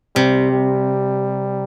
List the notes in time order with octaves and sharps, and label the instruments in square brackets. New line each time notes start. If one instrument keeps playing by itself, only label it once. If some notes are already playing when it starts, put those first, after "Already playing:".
[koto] C3 [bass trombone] G3
[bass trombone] G3